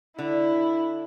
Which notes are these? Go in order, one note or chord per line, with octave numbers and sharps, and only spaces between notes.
D3 E4